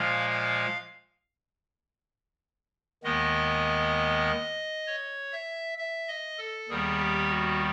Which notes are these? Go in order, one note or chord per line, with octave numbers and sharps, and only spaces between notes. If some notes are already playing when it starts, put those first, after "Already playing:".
Already playing: A#2 F3 G#3 F5
F5
D#2 D#3 G#3 B3 D#5
C#5
E5
E5
D#5
A4
D#2 D#3 G3 B3 G#4
G4
F#4